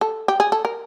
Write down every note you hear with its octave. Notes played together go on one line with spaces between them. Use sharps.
A4
G4
G#4
A4
A#4